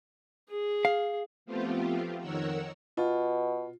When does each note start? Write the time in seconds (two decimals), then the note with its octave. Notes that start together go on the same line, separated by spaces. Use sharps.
0.50 G#4
0.85 F5
1.46 F3 A3 B3 C4 F4 G4
2.20 F2 D#3 A#4 C#5 F#5 E6
2.97 B2 F4